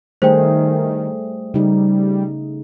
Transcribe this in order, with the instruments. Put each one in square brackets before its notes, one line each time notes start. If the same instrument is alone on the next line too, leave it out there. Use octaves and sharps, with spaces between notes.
[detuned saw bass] D#3 [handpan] G3 A3 G#4 [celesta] C5 G5
[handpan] C#3 D#4 [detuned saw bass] G3